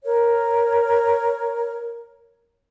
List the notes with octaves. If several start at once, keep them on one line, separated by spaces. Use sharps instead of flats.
A#4 C#5